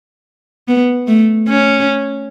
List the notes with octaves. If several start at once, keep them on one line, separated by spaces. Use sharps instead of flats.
B3
A3
C#4